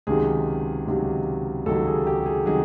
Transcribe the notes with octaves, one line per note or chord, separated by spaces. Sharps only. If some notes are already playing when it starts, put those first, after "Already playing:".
C#2 C3 D#3 F#3 G#4
C#2 C3 D#3 F#3
C#2 C3 D#3 F#3 A4
G#4
G4
G#4
C3 D#3 F#3 G#4